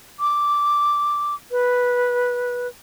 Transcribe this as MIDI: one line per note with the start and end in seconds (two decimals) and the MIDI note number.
0.20 1.35 86
1.51 2.68 71